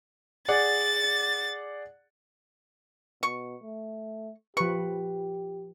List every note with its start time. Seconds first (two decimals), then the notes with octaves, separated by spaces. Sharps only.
0.48 G#4 D5 F#5 A6
3.23 B2 C#6
3.63 A3
4.57 F3 G4 B4 C#6